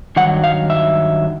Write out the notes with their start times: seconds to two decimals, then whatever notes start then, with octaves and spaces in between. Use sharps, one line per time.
0.16 G2 D#3 F#3 F#5
0.44 F5
0.70 E5